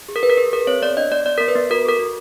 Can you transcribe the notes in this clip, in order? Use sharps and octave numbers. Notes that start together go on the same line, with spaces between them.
G#4
A#4
G#4 B4
A#4
G#4 B4
G#4 A#4
C4 C#5
B3 D5
D4 D#5
B3 D5
B3 D5
B3 A#4
B4
B3
F#4 A#4
A4 A#4
F#4